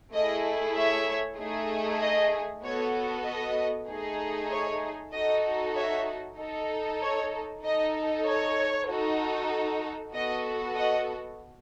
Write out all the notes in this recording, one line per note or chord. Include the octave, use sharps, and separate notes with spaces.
A3 E4 G#4 D#5
C#5 E5
A3 D#4 G#4
D#5
B3 F#4 A4 C#5
D#5
A3 D#4 G#4
C#5
D#4 F#4 A4 D#5
C#5 E5
D#4 A4
C#5
D#4 A4 D#5
C#5
D#4 F#4 A4
B3 F#4 A4 D#5
D#5 F#5